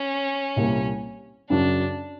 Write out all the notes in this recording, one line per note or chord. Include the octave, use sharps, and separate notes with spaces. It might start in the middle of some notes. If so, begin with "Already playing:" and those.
Already playing: C#4
C2 A#2 G3
F#2 C#3 F#3 D4